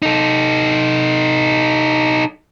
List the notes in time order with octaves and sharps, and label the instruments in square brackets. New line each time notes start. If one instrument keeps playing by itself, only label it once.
[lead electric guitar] D#4 A4